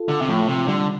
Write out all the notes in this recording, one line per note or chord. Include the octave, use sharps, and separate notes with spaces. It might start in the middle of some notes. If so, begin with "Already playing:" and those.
Already playing: F4 A4
D3
C3
A2 F3
C3
D3 G3